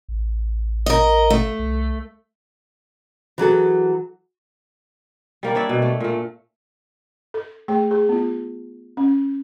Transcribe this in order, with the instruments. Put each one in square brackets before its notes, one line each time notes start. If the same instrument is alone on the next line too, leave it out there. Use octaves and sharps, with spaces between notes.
[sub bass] A1
[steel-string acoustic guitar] A#4 D#5
A3
[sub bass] C2
[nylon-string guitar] E3 F#3 G#4 A4
[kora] G3 A#3 D5
D4 C#5 D5 E5
B2
A3
A#2 A3
[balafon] A4
A3 G#4 G5
G#4
B3 F4
C#4